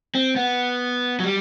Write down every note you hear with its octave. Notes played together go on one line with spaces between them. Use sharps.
C4
B3
F#3
G3